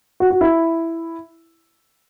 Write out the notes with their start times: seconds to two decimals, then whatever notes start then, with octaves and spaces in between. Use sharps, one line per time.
0.20 F#4
0.30 F#4
0.41 E4